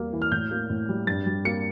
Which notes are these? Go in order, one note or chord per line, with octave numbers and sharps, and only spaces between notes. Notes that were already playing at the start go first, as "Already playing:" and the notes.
Already playing: E2 G3 A#3
E3
F6
A2 G6
A#3
A2
G3
G2 A6
G3
A#3 C#7